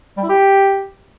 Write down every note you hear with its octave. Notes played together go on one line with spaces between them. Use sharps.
G3
E4
G4